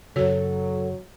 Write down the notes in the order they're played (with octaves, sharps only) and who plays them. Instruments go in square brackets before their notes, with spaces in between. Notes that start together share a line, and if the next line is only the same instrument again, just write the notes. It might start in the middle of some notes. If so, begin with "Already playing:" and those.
[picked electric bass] F#2 C#3 [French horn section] F#3 [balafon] F#4 C#5 [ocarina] A4